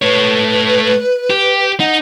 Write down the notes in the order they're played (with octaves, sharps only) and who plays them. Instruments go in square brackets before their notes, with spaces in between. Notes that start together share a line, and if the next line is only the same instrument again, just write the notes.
[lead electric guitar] A3 C#5 [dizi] B4
[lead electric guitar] G4
[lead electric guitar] D#4 [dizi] F#5